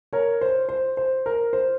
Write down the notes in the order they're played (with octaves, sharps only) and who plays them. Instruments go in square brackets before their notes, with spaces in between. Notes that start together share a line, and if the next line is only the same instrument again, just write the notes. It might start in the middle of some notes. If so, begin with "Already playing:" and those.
[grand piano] A#4 C#5
C5
C5
C5
A#4
C5